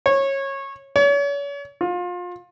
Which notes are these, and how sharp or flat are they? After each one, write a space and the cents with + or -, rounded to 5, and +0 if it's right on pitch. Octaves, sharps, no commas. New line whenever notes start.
C#5 -20
C#5 +40
F4 +30